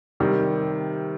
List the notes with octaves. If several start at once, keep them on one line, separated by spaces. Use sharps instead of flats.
C3 D#3 G3